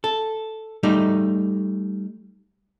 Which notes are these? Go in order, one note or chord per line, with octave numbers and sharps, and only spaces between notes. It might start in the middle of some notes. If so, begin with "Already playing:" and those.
A4
G3 A3 D#4